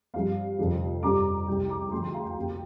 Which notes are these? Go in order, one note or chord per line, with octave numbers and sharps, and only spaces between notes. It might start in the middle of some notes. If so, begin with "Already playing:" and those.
G2 F3 C4 F5
F1 F2 D3 F3 C4
G2 G3 D4 A#5 D6
C2 C3 G3 G5
A#5 D6
D2 D3 F3 G5 C6
G5 C6
F5 A#5
G5
F2 C3 A#3